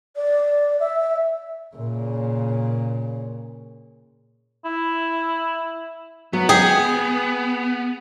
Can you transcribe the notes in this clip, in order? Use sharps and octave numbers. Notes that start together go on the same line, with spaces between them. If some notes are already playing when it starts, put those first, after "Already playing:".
D5
E5
A#2 C#3
E4
F#3 B3
G#4 G5